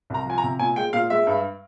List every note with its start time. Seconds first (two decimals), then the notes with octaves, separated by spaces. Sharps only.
0.10 C2 A#5
0.26 F3 G#5
0.38 A#5
0.44 C3
0.59 A#2 G#5
0.76 G#3 G5
0.93 A#2 F5
1.10 G#3 E5
1.27 G2